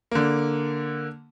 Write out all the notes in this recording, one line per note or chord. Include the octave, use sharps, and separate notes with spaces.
D3 A#3